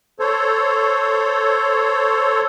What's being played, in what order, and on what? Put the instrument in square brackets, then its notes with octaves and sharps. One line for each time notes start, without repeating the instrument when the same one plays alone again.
[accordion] A4 C5 C#5